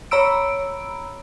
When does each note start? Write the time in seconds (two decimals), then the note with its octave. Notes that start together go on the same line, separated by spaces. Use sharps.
0.11 C#5 A#5 B5 E6 D7